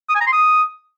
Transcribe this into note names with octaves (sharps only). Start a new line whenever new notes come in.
D#6
G#5
A#5
C6
D#6